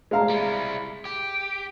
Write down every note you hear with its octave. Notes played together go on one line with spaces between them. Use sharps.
G#3 F5 A#5
G3 E4
G4